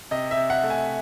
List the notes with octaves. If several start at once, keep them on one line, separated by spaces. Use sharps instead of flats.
C3 D#5
E5
C3
F#5
A3
G#5